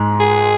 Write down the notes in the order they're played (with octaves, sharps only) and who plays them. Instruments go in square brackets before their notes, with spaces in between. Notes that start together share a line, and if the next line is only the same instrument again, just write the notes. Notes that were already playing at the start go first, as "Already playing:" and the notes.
Already playing: [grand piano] G#2 G#3
[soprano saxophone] G#4